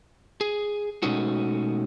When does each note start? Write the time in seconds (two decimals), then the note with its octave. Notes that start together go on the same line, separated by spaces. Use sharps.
0.41 G#4
1.03 B2 G#3 A3 C#4 D#4 F#4